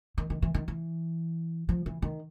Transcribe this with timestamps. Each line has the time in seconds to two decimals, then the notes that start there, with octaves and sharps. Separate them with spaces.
0.18 D#3
0.30 D#3
0.42 E3
0.54 D#3
0.68 E3
1.69 F3
1.86 E3
2.02 D#3